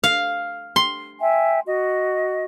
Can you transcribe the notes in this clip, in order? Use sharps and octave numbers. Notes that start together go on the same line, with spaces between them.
F5
C6
E5 G5 G#5
F#4 D#5